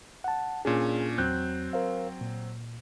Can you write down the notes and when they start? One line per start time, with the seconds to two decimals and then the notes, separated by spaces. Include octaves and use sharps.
0.24 F#5 A5
0.65 A#2 C#4 D4 G#4
1.18 E2 F#3 C4 F#6 G6
1.73 A#4 C5 F5
2.21 A#2